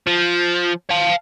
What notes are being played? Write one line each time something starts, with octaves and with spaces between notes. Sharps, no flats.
F3
F5 A5